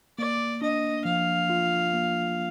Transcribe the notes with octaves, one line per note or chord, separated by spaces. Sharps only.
A#3 D5
D4 D#5
F3 F5
F4
A#3